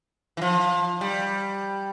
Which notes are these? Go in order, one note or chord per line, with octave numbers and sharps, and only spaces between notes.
E3
F3
G3